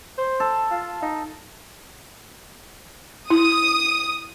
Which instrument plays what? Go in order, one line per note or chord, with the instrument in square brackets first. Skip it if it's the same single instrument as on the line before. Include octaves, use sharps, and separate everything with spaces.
[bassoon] C5
[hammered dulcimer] A4
[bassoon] F4
D#4
[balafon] E4 [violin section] D#6